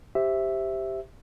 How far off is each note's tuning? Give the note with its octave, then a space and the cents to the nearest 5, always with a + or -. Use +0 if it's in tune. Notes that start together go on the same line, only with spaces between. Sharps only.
G4 +0 C5 +0 E5 +0